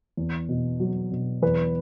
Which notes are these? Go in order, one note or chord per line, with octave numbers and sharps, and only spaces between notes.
E2
B2
F#3
B2
E2 B4